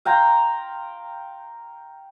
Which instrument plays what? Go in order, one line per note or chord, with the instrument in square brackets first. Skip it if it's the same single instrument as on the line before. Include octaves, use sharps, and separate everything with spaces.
[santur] F5 G5 A#5 C6